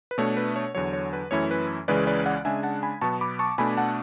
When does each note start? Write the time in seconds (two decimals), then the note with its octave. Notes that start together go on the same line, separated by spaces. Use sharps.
0.11 B4
0.18 B2 A3 D4 C#5
0.37 B4
0.56 C#5
0.75 E2 D3 F#3 C#5
0.93 C#5
1.13 B4
1.31 F#2 E3 A3 C#4 E4 C#5
1.51 B4
1.88 C#2 C#3 E3 G#3 C#4 B4 D5
2.07 B4 D5
2.26 D5 F#5
2.45 C#3 G#3 D4 E5 G#5
2.63 F#5 A5
2.83 G#5 B5
3.01 B2 F#3 B3 A5 C#6
3.21 B5 D6
3.39 A5 C#6
3.58 B2 A3 D4 G#5 B5
3.77 F#5 A5